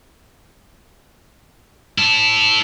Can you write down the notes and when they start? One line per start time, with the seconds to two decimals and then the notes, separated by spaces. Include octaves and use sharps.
1.98 E4 A5